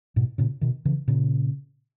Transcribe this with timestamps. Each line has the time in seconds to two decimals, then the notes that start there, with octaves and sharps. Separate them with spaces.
0.16 G#2 B2
0.38 A#2 C#3
0.61 B2 D#3
0.85 C#3 E3
1.08 A#2 C#3